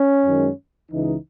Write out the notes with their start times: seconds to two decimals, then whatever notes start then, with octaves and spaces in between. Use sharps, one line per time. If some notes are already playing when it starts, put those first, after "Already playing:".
Already playing: C#4
0.25 F#2 D#3 G#3
0.91 C#2 C#3 E3 D#4